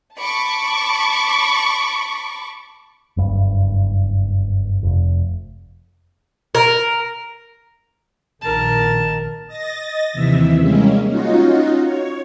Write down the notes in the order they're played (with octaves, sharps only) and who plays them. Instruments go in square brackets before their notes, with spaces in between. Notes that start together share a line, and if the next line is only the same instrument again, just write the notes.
[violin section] A5 B5 C#6 D6
[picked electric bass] F#1 G2
F1
[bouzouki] A#4
[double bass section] A#1 D#3 [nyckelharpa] A#4 A5
[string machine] D#5 A6 A#6
D#2 C3 E3 E5
G3 G#3 A#3 C#4
C#4 D#4 F4 F#4
C#5